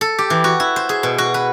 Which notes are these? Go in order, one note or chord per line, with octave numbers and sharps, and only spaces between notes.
A4
G4
E3
F#4
E4
C5
G#4
B2
F#4
B4